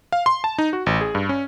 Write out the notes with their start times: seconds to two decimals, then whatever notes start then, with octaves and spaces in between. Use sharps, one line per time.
0.12 F5
0.26 C6
0.44 A5
0.58 D#4
0.73 F#4
0.86 A1
1.01 G#4
1.15 G2
1.29 C#4